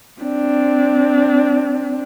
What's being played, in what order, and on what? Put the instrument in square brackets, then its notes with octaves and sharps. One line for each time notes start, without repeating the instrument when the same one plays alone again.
[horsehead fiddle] C4 D4